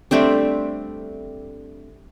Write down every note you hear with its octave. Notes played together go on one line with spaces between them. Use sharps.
G3 A3 C4 D4